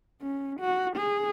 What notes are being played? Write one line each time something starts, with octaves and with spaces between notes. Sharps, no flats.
C#4
F#4
G#4